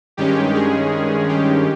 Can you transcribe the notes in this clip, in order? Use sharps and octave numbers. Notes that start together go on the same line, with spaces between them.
G2 D#3 G#3 C#4 G4
G#4
G4